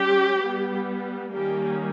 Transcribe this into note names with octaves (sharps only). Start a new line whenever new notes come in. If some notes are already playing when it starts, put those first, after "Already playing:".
Already playing: G3 C#4 G4
G3 B3
D#3 G3 A#3 C#4 G4